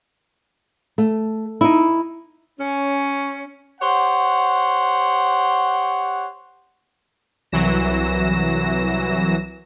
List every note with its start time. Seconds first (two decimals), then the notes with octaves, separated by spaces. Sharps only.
0.98 A3
1.61 D#4 E4
2.60 C#4
3.81 G4 C5 C#5 F#5
7.52 C2 E3 F#3 A#6 E7